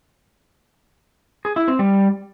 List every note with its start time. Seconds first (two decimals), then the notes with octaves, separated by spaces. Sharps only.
1.45 G#4
1.56 E4
1.68 C4
1.79 G3